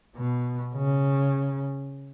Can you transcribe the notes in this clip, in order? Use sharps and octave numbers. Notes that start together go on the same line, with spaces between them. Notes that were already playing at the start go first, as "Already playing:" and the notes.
B2
C#3